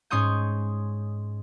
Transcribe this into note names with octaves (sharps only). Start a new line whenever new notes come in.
G#2 C#4 C6 C#6 D#6 G6